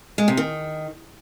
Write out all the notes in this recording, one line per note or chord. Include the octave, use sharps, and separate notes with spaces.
G#3
C3
D#3